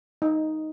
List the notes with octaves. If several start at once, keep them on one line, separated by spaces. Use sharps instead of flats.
D#4